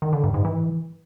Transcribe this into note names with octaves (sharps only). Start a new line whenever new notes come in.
D#3
D3
G2
G#2
E3